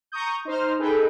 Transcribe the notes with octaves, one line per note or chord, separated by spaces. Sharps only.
A#5 C#6 D#6 G6
D#4 C5 F6
D#4 G#4 A4 B4 G5